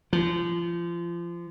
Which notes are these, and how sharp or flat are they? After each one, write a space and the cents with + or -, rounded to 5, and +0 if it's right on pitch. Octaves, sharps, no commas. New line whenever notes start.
F3 -30